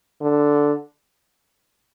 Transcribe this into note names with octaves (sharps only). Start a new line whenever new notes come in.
D3